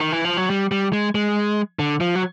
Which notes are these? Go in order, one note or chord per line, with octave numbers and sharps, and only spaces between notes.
D#3
E3
F3
F#3
G3
G3
G#3
G#3
D3
F3
F#3